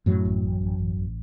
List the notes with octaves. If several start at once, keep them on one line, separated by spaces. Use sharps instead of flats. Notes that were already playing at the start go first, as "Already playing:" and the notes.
F#2 A2 F#3
A1
A1
A1
A1
A1